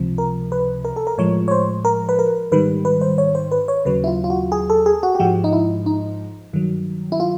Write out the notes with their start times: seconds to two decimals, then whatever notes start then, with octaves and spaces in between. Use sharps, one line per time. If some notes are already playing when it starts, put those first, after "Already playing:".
Already playing: C#2 C3 F3
0.18 A#4
0.52 B4
0.85 A#4
0.96 A4
1.07 A#4
1.18 A2 F3 G#3 C#5
1.48 C#5
1.51 C5
1.85 A#4
2.09 B4
2.19 A#4
2.52 G#2 D#3 G3 B4
2.85 B4
3.01 C5
3.18 C#5
3.35 C5
3.51 B4
3.68 C#5
3.85 D#2 C#3 F#3 B4
4.04 E4
4.07 F4
4.24 F4
4.30 F#4
4.52 G#4
4.70 A4
4.86 G#4
5.03 F#4
5.15 G4
5.19 G#2 F3 G#3 F#4
5.44 D#4
5.53 E4
5.86 D#4
6.53 G2 D#3 F#3
7.12 E4
7.20 F4